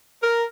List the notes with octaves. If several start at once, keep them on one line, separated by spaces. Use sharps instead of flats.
A#4